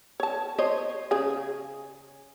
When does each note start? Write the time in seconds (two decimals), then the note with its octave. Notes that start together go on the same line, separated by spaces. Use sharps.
0.20 C#5 A5
0.58 C5 C#5 D#5
1.11 C#3 G#4